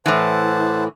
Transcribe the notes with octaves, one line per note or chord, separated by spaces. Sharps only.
A2 E3 C5 F#5 A5